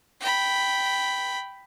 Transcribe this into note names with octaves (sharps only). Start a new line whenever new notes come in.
G5 B5